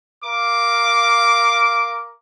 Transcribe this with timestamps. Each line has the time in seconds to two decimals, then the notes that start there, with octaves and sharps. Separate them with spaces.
0.25 A#4 F5 D6